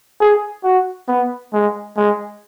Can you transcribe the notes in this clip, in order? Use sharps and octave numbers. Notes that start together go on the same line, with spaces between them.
G#4
F#4
B3
G#3
G#3